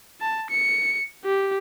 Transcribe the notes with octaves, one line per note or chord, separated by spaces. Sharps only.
A5
C#7
G4